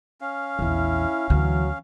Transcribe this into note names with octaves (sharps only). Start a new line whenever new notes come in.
C#4 F5
A#1 E2 E4
D2 E3 F#3